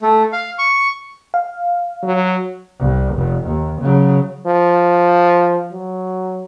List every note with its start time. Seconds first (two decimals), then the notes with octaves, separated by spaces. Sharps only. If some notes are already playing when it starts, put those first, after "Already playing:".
0.02 A3
0.33 F5
0.59 C#6
1.34 F5
2.03 F#3
2.80 C2
3.14 F1
3.47 D#2
3.81 C#3 F#3
4.46 F3
5.72 F#3